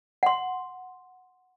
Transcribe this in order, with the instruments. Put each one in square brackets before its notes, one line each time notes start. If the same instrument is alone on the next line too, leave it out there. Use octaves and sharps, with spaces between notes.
[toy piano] F#5 C6